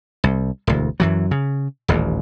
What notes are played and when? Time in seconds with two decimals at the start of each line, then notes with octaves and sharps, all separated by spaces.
0.24 C2
0.67 E1 D2
1.00 F#2 E3 F#3
1.31 C#3
1.88 D#1 A1 D#2